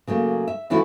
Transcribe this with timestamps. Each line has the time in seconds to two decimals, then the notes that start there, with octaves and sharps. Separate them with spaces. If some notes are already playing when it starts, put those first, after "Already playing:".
0.07 C#3 F#3 A3 A#3
0.47 E5
0.70 C#3 E3 A3 C#4 E4 F#4